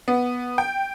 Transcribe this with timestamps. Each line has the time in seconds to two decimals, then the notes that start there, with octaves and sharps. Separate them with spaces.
0.08 B3
0.58 G5